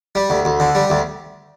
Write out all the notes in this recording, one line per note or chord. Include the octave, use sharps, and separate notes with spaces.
G3
D2
D2
D3
G3
D2